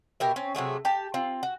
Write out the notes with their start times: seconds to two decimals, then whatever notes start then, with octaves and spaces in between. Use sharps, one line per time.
0.20 B2 G4 A#4 E5
0.36 C4 C#4
0.55 C3 F#3 A3 G#4
0.85 G4 A5
1.14 C4 F4
1.43 F#4